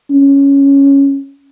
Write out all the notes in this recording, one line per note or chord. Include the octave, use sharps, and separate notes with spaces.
C#4